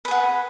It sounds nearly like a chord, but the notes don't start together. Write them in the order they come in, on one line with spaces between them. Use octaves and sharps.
B4 G#4 F#5